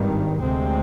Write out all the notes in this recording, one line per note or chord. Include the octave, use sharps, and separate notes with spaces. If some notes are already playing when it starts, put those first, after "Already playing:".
Already playing: G#1 G2 D#3 G3
D2 C3 G#3 C4